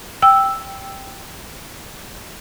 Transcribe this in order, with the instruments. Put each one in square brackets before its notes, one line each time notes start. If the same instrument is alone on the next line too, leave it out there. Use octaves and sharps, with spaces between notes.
[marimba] G5 E6